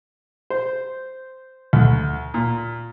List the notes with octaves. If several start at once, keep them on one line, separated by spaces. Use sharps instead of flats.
C5
D2
A#2